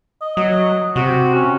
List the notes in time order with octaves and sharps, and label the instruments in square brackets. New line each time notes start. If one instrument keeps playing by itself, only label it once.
[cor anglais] D#5
[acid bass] F#3 [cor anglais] D#5
[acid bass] C3 [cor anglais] F#4
[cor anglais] C#4